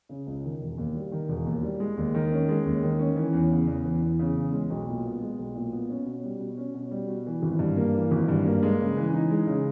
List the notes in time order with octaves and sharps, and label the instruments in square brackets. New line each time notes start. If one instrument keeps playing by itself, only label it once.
[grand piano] C#3
C#2
D#3
E1
D#2
G3
D#3
E1
D#2
G3
G#3
D#2
D#3
C#4
G#3
D#2
D#3
C#4
E3
E2
C#3
E2
E3
E2
C#3
E2
G#3
B1
A#2
B3
G#3
B1
A#2
B3
C#4
B2
G3
B2
C#4
B2
G3
B2
E3
G#1
G2
A#3
E3
G#1
G2
A#3
G#3
C#3
E3
D#4
G#3
C#3